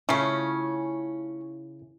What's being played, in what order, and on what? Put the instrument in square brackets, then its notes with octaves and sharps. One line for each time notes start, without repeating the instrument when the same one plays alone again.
[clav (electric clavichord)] C#3 [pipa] A3 C#4 [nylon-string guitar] E4 F4 C#5